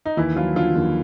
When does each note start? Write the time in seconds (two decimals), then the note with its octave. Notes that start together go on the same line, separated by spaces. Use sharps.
0.06 D#4
0.17 D#2 E3 E4
0.36 F3 F#3 F4
0.55 D3 F3 F4
0.75 D#2